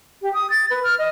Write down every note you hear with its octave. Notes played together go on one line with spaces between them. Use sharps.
G4
D#6
A6
B4
F6
D#5